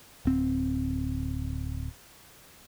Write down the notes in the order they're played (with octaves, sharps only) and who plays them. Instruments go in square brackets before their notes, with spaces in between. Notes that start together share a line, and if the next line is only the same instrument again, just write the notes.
[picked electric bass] D1 C4